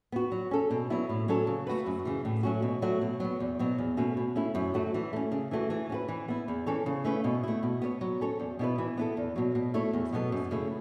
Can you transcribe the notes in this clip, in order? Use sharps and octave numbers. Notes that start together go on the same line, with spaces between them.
B3 F#4
F#3
C#4 A4
B2
F#3 B3 E4
A2
F#3 C#4 A4 C#5
C#3
A3 F#4 B4
F#2
C#3 E3
A2
F#3 A3 C#4 F#4
B2
F#3 A3 F#4
B2
F#3 B3
E2
B2 F#3 B3
E2
B2 A3 C#4 F#4
B2
A3 C#4 E4
F#2
F#3 A3 F#4
E3
A3 C#4
C#3
E3 A3 F#4
E3
C#4 F#4 B4
E3
B3 E4
E2
E3 C#4 A4 C#5
C#3
A3 C#4 E4 B4
B2
A3 E4
B2
B3 A4 C#5
F#3
C#4 A4 C#5
E2
B2 B3 E4 B4
E3
B3 E4 A4
E2
B2 F#3
B2
A3 E4 A4 C#5
E2
B2 F#3 B3 A4
F#2
C#3 A3 C#4 E4